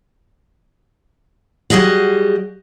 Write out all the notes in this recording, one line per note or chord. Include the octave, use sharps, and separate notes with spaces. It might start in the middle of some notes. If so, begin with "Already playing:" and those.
F#3 G3 G#4 D#5 F#5